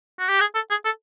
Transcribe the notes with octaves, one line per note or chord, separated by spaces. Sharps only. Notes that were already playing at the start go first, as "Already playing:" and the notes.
F#4
G4
G#4
A4
G#4
A4